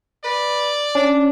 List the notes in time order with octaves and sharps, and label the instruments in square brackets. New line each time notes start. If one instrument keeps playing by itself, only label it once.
[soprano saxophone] B4 [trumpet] D5
[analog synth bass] C#4 [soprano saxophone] D4